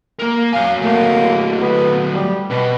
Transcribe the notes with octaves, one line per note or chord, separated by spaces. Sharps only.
A#3 A#4
F#3 F5 G#5
F#3 A3 A#3
B3
G3
B2 B4